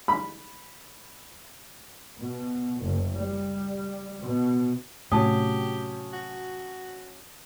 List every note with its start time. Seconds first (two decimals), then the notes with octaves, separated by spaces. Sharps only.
0.08 B5
2.19 B2
2.81 F#1
3.16 G3
4.21 B2
5.12 A2 C3 F#3 C#4 G4 A5 D#6
6.13 F#4